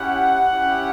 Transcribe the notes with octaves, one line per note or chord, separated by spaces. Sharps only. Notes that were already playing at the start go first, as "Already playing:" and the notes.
Already playing: C#4 E4 G4 F#5
C#4 E4 G4